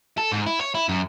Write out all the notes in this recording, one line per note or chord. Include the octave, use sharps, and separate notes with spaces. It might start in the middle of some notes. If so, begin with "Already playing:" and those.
A4
G#2
E4
C#5
E4
F#2